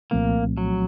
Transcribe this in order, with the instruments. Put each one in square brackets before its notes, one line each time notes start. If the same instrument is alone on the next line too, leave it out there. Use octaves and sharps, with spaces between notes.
[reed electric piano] C2 A#2 F3 A3 C4 [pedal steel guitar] A#3
[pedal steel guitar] F#3